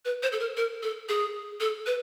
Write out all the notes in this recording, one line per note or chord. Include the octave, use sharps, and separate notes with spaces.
B4
C5
A4
A#4
A#4
A4
G#4
A4
B4